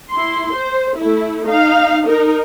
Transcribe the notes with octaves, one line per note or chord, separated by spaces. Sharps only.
E4 C6
C5
A3 E4
D#4 F5
D#4 A#4